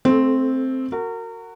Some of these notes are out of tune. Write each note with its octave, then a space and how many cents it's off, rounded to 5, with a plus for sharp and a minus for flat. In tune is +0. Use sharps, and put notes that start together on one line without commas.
A3 +0 C4 +0 A4 -25
F#4 +0 A#4 -30